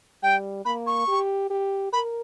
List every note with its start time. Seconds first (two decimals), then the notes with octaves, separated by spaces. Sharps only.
0.23 G3 G5
0.65 A#3 B5
0.87 C#6
1.08 G4
1.50 G4
1.93 A#4 B5